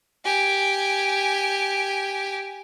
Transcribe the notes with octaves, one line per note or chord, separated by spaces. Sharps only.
G4 G#5